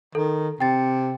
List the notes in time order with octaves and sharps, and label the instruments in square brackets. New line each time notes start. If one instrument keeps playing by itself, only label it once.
[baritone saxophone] D#3 [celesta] A4
[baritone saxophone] C3 [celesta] G5 A6